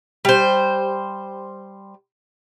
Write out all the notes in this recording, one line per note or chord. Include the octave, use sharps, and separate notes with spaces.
G3 C5